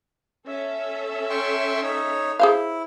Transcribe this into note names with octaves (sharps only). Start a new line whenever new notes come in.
C#4 A4 E5
G5 C6 C#6
D#4 C#5
E4 G#4 C5 F5